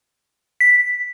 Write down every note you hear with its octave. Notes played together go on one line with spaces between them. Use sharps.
B6